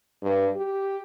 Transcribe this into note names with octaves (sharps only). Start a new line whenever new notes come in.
G2
G4